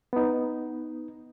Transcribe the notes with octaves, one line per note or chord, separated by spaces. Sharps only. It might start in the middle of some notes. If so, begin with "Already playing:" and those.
B3 D#4